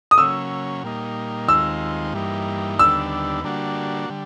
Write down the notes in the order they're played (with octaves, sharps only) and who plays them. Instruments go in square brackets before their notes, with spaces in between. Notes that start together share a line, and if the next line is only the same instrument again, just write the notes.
[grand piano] D#6
[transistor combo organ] C#3 F#3 A#3 C#4 [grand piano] E6
[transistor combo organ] A#2 G3 A#3 D#4
[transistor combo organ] D#2 D#3 G#3 C4 F4 [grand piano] E6
[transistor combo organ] G2 E3 G3 A#3 D#4
[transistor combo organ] D#2 D3 G3 B3 D4 [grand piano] E6
[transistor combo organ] D3 G3 A#3 D4 F#4
D3 G3